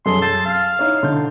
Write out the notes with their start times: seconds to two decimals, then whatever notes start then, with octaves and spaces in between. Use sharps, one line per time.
0.06 F#2 G#4 A4 C6
0.22 A5 E6 G6 C7
0.45 F5
0.79 D#4 E4 C#5
1.03 D3 G6